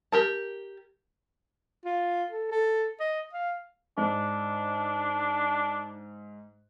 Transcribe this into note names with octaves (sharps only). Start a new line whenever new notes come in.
G4 A#4 A5
F4
A4
A4
D#5
F5
G#2 D4